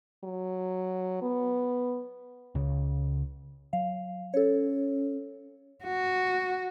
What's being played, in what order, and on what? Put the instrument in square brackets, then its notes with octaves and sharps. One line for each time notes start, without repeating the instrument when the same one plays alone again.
[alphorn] F#3
B3
[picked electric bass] C#2 C#3
[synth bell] F#3 F5
[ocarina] C#4 [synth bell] A4 C#5
[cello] F#4